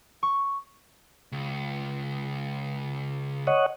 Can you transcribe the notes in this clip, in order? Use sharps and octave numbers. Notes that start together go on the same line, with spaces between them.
C#6
C#2
C#5 D#5 F#5